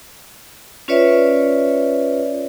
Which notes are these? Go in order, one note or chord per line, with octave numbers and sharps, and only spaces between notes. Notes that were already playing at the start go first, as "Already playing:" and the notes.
C#4 F4 B4 C#5 D5 E5